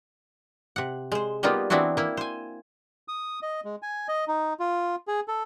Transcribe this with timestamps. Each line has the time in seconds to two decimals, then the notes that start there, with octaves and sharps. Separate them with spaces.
0.76 C3 F#5
1.12 G#3 C5
1.43 G3 A#3 B3 D#4 F4 G4
1.70 E3 B3 C4 D4 E4 F#4
1.97 A#3 E4
2.17 C5 G#5
3.08 D#6
3.42 D#5
3.65 G#3
3.82 G#5
4.08 D#5
4.28 D#4
4.60 F4
5.07 G#4
5.28 A4